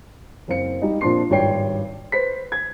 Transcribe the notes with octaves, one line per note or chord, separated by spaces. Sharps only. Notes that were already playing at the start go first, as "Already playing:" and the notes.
F#1 C4 F5 C#7
G3 D#4
A#2 F3 C4 D4 C6 C7
G#1 G2 C#5 D5 G5 C7
B4 C5 B6
G#6